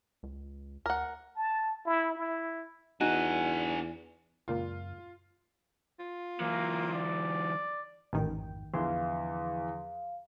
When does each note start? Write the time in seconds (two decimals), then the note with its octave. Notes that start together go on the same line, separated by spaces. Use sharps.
0.23 C#2
0.86 D2 A#4 F#5
1.36 A5
1.86 E4
2.18 E4
3.01 E2 D4 D#4 F#4 G#5
4.48 C#2 F#2 A#2 A#3 F4
5.99 F4
6.40 E3 F#3 A#3
6.94 D5
8.13 A1 F2 G#2 D#3 G5
8.74 E2 D3 E3 F3 F5 C6